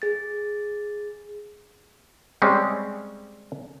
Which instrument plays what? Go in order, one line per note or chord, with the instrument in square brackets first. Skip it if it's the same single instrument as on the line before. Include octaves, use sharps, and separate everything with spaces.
[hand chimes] G#4 A6
[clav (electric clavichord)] G3 G#3 C4 C#4